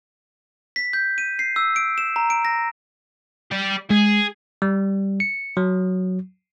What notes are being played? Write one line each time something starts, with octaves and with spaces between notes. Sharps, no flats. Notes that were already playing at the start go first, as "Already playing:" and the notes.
B6
G6
D#7
C7
E6
D7
E7
A#5
D7
A#6
G4 D5
G#3 G#4
G3
C#7
F#3